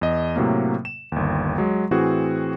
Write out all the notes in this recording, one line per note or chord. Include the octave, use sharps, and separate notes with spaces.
E2 D#5
A2 C3 F#3 A#3
E7
G1 D#2
F#3 G#3
A2 E3 C4 F#4 G#4